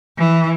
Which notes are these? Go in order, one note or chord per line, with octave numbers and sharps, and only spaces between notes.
E3